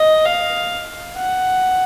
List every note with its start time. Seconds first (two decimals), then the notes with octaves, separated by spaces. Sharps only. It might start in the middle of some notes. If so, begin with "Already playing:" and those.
Already playing: D#5
0.26 F5
1.17 F#5